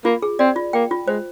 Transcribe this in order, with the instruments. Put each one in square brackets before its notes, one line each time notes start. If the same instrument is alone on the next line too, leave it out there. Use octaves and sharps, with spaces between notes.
[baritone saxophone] A#3 [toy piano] F4
[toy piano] G#4
[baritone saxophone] C4 [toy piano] D5
[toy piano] F4
[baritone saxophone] A#3 [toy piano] G5
[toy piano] F4
[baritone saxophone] G#3 [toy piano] C5